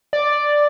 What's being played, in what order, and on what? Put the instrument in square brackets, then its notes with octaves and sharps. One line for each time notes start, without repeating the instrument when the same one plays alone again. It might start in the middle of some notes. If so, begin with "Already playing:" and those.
[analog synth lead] D5